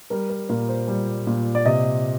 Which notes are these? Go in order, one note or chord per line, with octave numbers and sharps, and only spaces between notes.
G3 A#4
A#4
A#2 A#4
C5
G3
A#2
D5
C3 D#5